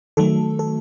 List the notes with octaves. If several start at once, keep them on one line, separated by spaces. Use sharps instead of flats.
D#3 F#3 A3 A4
A4